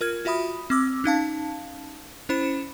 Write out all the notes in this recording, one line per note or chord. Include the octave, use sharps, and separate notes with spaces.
F4 A#4 F6 G#6
F4 F#4 E5 B5 D#6
C4 D6 E6
C#4 D#4 F5 A5
C#4 E4 C5 B5 C#7 E7